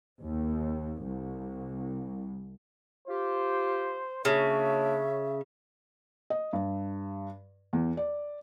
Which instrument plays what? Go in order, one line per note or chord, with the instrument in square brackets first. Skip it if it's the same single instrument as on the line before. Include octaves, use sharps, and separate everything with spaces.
[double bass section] D#2
C2
[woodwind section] F4 G4 [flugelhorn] C5
[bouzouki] C#3 [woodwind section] F#3 A#3 D4 [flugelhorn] C#5 [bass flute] E5
[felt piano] D#5
G2
E2
D5